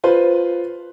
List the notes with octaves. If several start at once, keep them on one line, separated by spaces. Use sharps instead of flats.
F4 B4 C5